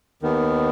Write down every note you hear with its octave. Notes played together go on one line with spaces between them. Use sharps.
D#2 D#3 B3